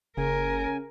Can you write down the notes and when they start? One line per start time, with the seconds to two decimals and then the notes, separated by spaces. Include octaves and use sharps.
0.17 F#1 C#3 A#4 G#5